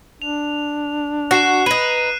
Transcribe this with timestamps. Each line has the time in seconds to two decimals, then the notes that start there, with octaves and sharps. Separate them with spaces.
0.22 D4 F7
1.31 F#4 F#6 C7 E7
1.66 D#4 B4 D#7